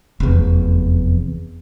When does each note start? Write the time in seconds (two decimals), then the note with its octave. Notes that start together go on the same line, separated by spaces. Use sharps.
0.20 F1 E2